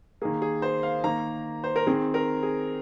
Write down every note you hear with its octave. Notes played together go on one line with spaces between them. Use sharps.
D#3 A#3 G#4
G#4
C5
F5
D#3 A#3 A#5
C5
A#4
D#3 C4 G#4
A#4
G#4